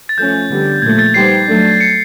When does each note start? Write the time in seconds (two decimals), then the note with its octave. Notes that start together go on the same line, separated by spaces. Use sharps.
0.09 A6
0.17 F3 A3 C#4 G6
0.50 D3 G3 B3
0.82 A#2 F3 A3 G#6
0.99 A6
1.14 G3 B3 D#4 G4 C5 C7
1.47 F#3 A3 D4
1.81 C#7